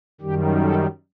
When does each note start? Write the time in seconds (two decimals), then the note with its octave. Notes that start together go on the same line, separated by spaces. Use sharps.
0.21 F#2 D#3 G3 G4
0.62 A4